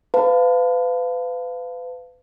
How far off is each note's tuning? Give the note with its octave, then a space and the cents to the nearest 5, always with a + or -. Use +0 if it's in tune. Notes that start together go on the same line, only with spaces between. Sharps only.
B4 +35 F5 -5 A5 +20